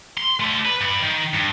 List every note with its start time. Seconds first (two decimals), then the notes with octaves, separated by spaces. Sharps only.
0.18 C6
0.40 D3 A3
0.65 B4
0.81 G2 B5
1.02 D#3
1.34 G2